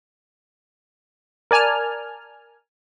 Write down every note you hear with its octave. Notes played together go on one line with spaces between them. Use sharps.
A#4 D5 G#5 A5 F6